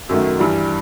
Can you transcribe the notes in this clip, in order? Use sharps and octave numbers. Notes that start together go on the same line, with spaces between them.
F#2 D#3 F#3 A3
G2 E3 G3